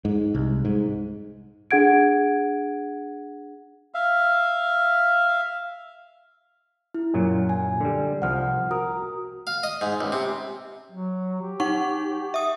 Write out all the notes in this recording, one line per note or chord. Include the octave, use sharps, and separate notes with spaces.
G#2
C2
G#2
D4 G#4 F#5 G#6 D7
E5 F5
E4
F#2 A#2 F#3
G#5
D3 G3
C2 F3 F#5 F6
F#4 A#4 D#6
F5
D#5
G#2
C#2
C3
F#3
G4
D#4 F#5 C#6
E5 D#6